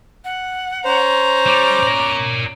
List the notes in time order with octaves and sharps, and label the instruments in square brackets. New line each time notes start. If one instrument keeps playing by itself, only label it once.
[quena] F#5
[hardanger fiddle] C#4 A#5 [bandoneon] C5
[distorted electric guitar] G3 [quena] D6
[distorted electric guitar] A#4 D5